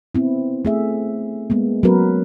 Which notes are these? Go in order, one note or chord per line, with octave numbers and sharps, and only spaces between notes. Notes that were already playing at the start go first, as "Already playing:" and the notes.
B3 C4 E4
A3 G#4 E5
G#3 A#3 B3
F#3 B3 C#4 F#4 A#4 B4